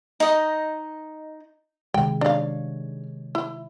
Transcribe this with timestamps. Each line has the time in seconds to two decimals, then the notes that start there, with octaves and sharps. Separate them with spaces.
0.20 D#4 D#5
1.94 C3 D#3 G#3 G5
2.21 D4 C#5 F5
3.35 E4